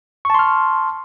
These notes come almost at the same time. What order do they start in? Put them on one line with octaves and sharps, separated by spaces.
C#6 A5 C6 F6